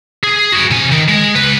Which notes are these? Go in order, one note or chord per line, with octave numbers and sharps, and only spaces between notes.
G#4
F#4 G#4
C3 G#5
D#3
G#3
C#2 B4